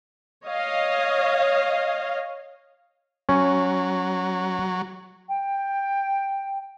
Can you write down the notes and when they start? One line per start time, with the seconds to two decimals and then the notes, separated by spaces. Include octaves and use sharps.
0.45 C#5 D#5 F5
3.29 F#3 C#4
5.29 G5